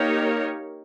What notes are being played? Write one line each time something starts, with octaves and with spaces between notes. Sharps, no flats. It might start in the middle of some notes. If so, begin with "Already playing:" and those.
Already playing: A#3 D#4 G4 A#4 C#5